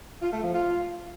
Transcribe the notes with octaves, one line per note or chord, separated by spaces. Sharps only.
F4
A3
F3
F4